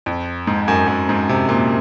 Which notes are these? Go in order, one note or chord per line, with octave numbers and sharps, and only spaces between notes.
F2
G#2
F#2
F#2
G#2
C3
A#2